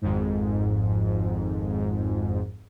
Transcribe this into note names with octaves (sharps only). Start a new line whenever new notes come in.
G#1 F2 G#2